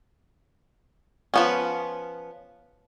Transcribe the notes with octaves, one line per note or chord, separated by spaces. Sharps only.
F3 B3 C#4